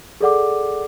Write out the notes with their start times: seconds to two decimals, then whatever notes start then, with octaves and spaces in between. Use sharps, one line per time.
0.21 G#4 A4 D5 F#5 D6